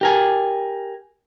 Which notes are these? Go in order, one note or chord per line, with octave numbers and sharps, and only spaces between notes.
G4 A#4 G#5